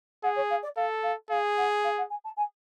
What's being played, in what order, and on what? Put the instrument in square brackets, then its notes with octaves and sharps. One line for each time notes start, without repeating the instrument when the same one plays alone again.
[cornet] G#4 [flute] F#5
[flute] C#5
F5
D5
[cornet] A4 [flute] F5
[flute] F5
[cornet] G#4 [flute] F5
[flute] F#5
F5
F#5
G#5
A5
G#5